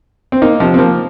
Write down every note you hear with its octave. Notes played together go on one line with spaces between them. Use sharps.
C4
A#3 D#4
C3 F3
C4
F3 A#3